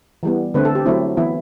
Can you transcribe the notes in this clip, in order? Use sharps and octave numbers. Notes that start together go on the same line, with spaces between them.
E3 G3 B3
D3 A3 C4 B4
A4
G4
F#3 A3 C4 E4
E3 B3 E4